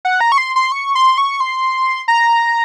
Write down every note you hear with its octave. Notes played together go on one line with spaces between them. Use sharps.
F#5
A#5
C#6
C6
C6
C#6
C6
C#6
C6
A#5